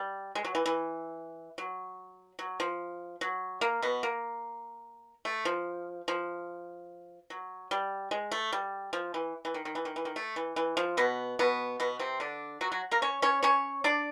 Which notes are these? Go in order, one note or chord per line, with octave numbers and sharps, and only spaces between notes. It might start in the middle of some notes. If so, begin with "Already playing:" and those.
Already playing: G3
G#3
F#3
E3
E3
F#3
F#3
F3
F#3
A#3
B2 B3
A#3
A3
F3
F3
F#3
G3
G#3
A3
G3
F3
E3
E3
D#3
D#3
E3
D#3
E3
D#3
A3
E3
E3
F3
B2 B3
B2 B3
B2 B3
C3 C4
D3 D4
F#3 F#4
F#3 F#4
A#3 A#4
C#4 C#5
C#4 C#5
C#4 C#5
D4 D5